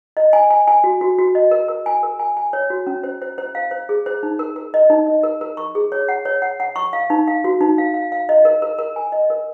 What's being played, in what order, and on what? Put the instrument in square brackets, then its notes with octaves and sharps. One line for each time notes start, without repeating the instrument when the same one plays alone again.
[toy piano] D#5
G#5
G#5
G#5
F#4
F#4
F#4
D#5
A#4
A#4
G#5
A#4
G#5
G#5
C#5
F#4
C#4
C5
C5
C5
F5
C5
G#4
C5
D#4
A#4
A#4
D#5
D#4
D#5
A#4
A#4
C#6
G#4
C#5
F#5
C#5
F#5
F#5
C#6
F5
D#4
F5
F#4
D#4
F5
F5
F5
D#5
A#4
A#4
A#4
G#5
D#5
A#4